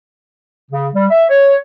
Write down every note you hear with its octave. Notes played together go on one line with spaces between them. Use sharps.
C#3
G3
E5
C#5